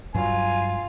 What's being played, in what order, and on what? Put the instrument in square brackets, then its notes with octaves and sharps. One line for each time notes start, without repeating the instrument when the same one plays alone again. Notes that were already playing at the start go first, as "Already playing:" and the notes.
[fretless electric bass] G2 F#3 [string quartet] F4 [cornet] G#5